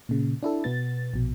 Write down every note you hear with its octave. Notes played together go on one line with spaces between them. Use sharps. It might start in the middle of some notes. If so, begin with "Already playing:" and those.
A#2 C#3
D4 E4 A4
B2 B3 A6
A#1 B2